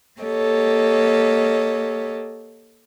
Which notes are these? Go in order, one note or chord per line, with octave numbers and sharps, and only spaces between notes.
A#3 G4 A4 C#5 D#5